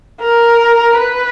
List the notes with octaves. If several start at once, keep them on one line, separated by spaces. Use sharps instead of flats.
A#4
B4